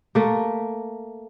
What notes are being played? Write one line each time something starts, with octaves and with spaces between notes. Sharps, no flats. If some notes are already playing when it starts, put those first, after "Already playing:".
A3 A#3